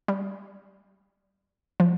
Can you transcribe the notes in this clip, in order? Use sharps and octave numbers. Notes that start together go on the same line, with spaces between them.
G3
F3